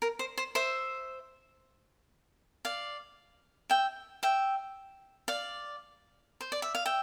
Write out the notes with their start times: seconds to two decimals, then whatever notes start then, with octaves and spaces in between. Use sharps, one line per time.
0.02 A#4
0.19 C5
0.38 C5
0.55 C5 E5
2.65 D5 F5
3.70 E5 G5
4.23 E5 G5
5.28 D5 F5
6.41 C5
6.52 D5
6.62 E5
6.75 F5
6.85 E5 G5